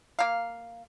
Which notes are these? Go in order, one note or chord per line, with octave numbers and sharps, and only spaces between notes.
A#3 F5